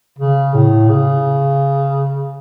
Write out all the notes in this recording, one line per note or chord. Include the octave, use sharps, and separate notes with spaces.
C#3
A2
C#3